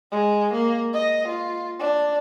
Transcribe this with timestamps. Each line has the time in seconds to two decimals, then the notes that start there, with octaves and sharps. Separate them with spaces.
0.12 G#3
0.53 A#3
0.94 D#5
1.28 F4
1.80 D4